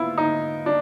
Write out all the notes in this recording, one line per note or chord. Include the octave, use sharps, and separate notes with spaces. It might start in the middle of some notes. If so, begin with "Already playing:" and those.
Already playing: B3 E4 F4
D#4
D4